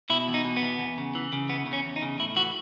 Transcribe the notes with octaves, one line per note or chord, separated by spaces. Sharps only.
B2 E4
E2
D#4
B2
B3
E2
E2
C#3
E3
C#3
E2 B3
C#3
C#4
E2
D#4
C#3
A2 E4
E3 F#4